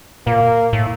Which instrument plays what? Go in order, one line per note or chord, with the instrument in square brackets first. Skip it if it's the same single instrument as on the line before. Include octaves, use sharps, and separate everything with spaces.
[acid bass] A#2 [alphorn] A#3
[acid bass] A2